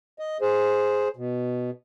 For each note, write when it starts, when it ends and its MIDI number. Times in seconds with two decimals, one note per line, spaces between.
0.19 0.37 75
0.41 1.08 68
0.41 1.08 72
1.17 1.70 47